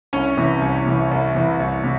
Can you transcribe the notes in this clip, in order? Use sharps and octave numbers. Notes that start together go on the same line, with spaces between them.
C2 C#4
C3 E3
C2
C3 E3
C2
C3 E3
C2
C3